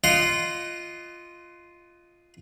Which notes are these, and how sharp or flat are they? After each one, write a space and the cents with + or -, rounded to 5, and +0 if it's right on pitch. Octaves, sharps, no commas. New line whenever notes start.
F4 -5 D#5 +0 F#5 +25